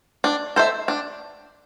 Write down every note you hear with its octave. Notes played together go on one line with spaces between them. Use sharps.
D4
A4 C5 E5
D4